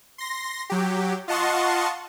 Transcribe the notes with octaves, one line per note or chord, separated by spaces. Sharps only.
C6 A#6
F#3 G4
F4 D#5 F#5 A5 C6 C#6